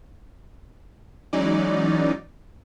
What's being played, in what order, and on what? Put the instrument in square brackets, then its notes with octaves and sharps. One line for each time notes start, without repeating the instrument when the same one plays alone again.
[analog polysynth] E3 F#3 G#3 C#4 D#4 D5